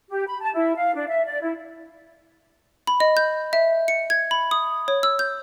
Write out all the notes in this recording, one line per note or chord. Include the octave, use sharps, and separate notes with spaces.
G4
B5
A5
E4
F5
D4
E5
D5
E4
B5
D#5
G6
E5
C#7
G#6
B5
D#6
C#5
E6
G6